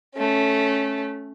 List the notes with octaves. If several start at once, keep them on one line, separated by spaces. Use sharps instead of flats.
A3 C#4